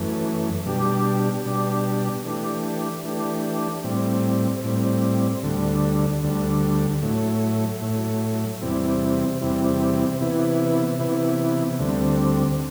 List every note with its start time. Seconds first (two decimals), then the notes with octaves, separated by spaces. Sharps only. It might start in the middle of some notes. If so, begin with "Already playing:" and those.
Already playing: F#2 E3 A3
0.66 B2 G3 D4 G4
1.46 B2 G3 D4 G4
2.25 E3 A3 D4 G4
3.04 E3 A3 D4 G4
3.84 A2 G3 C4
4.64 A2 G3 C4
5.43 D2 D3 G3
6.23 D2 D3 G3
7.02 A2 F#3 A3
7.82 A2 F#3 A3
8.61 E2 C3 G3 C4 E4
9.41 E2 C3 G3 C4 E4
10.20 C3 E3 B3 E4
10.99 C3 E3 B3 E4
11.79 D2 D3 G3 C4